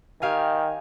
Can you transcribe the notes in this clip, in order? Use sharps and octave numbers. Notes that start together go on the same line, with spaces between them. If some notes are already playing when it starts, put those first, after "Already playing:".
D#3 G4 F5 G#5